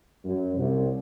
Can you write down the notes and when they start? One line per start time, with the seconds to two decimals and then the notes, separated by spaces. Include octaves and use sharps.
0.25 F#2
0.57 C2